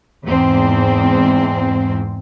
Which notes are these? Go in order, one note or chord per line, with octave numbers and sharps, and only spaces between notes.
E2 G#2 C4